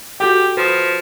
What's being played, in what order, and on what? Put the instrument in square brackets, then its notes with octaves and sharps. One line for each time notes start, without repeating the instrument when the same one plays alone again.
[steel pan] F#4 A4 G5 [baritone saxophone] G4
[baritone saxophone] F3 [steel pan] B4 D#6